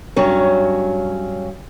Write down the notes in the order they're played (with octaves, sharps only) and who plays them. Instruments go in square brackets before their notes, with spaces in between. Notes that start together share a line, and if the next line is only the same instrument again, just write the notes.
[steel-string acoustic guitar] G2 F#3 C#4